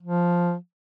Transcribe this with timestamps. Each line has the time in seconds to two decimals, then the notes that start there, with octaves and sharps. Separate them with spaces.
0.03 F3